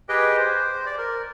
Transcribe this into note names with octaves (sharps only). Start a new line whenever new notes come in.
G4 G#4 B4 D#5 G5
C5
D5
A#4